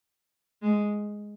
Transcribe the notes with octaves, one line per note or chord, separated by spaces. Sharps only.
G#3